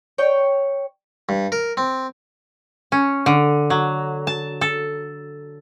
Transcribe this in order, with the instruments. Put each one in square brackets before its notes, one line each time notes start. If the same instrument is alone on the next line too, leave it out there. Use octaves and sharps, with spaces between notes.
[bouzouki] C#5 G5
[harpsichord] G2
A#4
C4
[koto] C#4
D3
F#3
A5
A4